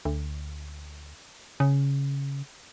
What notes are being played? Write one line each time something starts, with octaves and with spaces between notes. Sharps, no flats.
D2
C#3